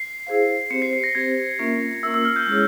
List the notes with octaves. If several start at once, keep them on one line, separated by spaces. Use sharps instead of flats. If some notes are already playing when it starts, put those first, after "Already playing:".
Already playing: C7
E4 G#4 C5 F5
C4 G4 C5 C#7
C7
C7
A#6
C4 G4 C5 G#6
A#3 C#4 F4 A#4 E5
A#3 C#4 F4 A#4 E5 E6
E6
F6
G6
G#3 C#4 E4 G#4 C#5